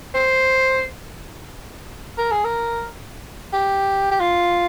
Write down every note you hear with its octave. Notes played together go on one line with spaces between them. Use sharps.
C5
A#4
G#4
A#4
G4
G4
F4